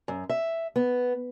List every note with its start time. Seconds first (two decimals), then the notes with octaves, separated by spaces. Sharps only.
0.08 F#2
0.29 E5
0.76 B3